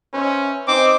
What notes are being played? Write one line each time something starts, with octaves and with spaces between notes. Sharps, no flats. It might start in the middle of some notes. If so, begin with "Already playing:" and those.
C#4 B4 C5 E5
C4 D#4 G#4 D6